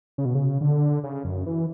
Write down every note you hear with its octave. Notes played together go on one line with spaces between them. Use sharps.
C#3
B2
C#3
D3
C#3
F#2
E3